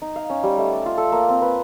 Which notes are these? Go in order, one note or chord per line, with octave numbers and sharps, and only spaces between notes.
D#4
F5
C#4
G3
A3
D5
F4
A4
A#3
C4
B4